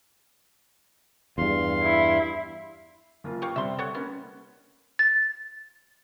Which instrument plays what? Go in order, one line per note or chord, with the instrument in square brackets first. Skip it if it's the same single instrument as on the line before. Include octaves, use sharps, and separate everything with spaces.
[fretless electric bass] E2 G2 [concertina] F5 C6
[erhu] E4
[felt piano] F#1 A#3 F4
[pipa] G4 C#5 F5
[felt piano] C3 G3 C4 [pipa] E5 C6
[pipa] A4 C#5 F#5
[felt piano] A#3 C#4 [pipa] B3
[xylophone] A6